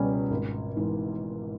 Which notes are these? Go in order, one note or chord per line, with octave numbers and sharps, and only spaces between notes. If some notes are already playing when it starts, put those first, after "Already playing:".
Already playing: C#2 B2 G3 C#4
G#1
G#2 E3